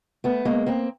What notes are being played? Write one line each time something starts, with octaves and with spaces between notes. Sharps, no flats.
A3 B3
G#3 A#3
A#3 C4